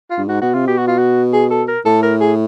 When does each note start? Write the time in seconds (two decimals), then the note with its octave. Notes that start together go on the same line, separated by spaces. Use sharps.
0.11 F4
0.17 G2
0.28 G#2 F#4
0.42 B2 F#4
0.54 C3 F4
0.67 B2 G4
0.78 F#4
0.87 F4
0.98 F#4
1.33 G#4
1.50 A4
1.68 A#4
1.85 A2 A4
2.03 A#4
2.20 G#4